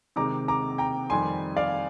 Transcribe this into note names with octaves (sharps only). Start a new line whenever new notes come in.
C3 D#3 G#3 C4 A#5 D6
A#5 D6
G5 A#5
F2 D#3 G3 C4 G#5 C6
D5 F5